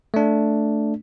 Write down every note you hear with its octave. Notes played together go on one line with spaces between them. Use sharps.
A3 D4